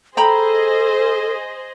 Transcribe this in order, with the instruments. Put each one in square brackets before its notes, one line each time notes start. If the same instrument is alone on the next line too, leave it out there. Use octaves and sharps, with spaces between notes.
[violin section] G#4 C5 D#5 [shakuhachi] A4 [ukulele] G5 A#5 B5